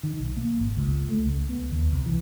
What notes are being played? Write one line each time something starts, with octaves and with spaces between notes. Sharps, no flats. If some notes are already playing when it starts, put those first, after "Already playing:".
D#3
B1
A#3
G#1
C#2
A3
C#2
B3
D#2
C2
E3